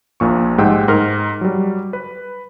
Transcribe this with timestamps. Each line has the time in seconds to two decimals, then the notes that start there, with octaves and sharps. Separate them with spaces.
0.20 A#1 A#2 C#6
0.58 G#2 G#3 G4 F#5 G5 E6
0.88 G#2 A#4 F6
1.41 F#3 G3
1.93 B4